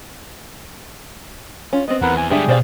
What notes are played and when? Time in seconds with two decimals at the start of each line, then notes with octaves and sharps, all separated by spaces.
1.73 C#4 F4
1.88 B3 C4 D#5
2.02 E2 A#4 B4 F#5
2.17 G#5
2.30 D3 G3 G#3 D4 G4 G#4 E5
2.49 B2 C5 D5 F5